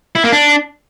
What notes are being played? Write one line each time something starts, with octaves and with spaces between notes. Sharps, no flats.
E4
A#3
D4